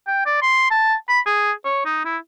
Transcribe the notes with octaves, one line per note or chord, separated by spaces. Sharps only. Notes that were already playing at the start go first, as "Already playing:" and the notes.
G5
D5
C6
A5
B5
G#4
C#5
D#4
E4